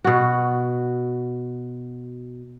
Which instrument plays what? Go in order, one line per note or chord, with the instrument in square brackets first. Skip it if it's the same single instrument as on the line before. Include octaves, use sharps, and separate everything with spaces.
[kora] B2 F#4